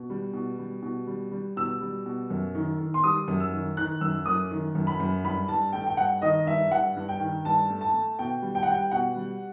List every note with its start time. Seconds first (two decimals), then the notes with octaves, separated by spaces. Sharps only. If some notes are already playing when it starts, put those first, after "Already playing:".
Already playing: B2
0.10 G3
0.33 B2
0.58 G3
0.82 B2
1.07 G3
1.31 G3
1.56 B2 E6
1.81 G3
2.06 B2
2.30 F#2
2.55 D#3
2.80 D#3
2.94 C6
3.04 G3 D#6
3.28 F#2
3.40 E6
3.53 D#3
3.77 D#3 F#6
4.01 F#2 E6
4.26 F#2 D#6
4.51 D#3
4.75 F#2
4.87 B5
5.00 F#2
5.24 G2 B5
5.48 G2 A5
5.73 A3 G5
5.87 G5
5.97 G2 F#5
6.22 D#3 D#5
6.46 G2 E5
6.71 G2 F#5
6.96 G2
7.09 G5
7.20 D#3
7.45 G2 A5
7.70 A3
7.81 A5
7.93 A3
8.19 B2 G5
8.42 G3
8.55 G5
8.63 F#5
8.67 G3 G5
8.91 B2 F#5
9.16 G3